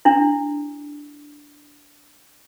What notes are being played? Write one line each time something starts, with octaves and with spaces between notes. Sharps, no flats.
D4 E4